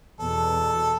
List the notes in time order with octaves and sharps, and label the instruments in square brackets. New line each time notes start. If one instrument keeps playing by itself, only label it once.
[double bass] E2 B2 [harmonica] A4